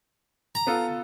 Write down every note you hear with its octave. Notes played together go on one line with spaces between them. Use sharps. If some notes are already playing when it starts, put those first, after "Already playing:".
A#5
B3 F4 A4